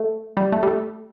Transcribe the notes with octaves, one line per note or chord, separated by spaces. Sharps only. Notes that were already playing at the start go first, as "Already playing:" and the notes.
Already playing: A3
G3
A3
G3
A3